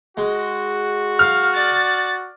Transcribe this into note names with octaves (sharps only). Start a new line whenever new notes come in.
G#3 F#4
F5 F6
D5 A6